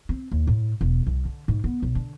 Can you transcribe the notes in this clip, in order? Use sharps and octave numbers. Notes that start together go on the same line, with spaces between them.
C4
D#2
A2
E1
C2
D3
G#2
B3
B1
D3